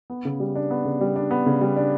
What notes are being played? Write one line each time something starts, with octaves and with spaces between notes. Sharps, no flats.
B3
C#3
G3
D4
B3
C#3
G3
D4
B3
C#3
G3
D4